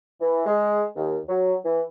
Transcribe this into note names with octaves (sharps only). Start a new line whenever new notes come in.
E3
G#3
D#2
F#3
E3